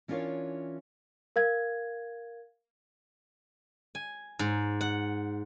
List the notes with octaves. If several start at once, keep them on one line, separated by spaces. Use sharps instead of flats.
E3 C#4 D4 F4 A#4 C#5
A#4 F5 G#6
G#5
G#2
F#5